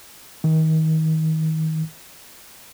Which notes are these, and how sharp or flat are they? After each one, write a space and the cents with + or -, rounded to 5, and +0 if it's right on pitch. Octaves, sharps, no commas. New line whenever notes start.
D#3 +30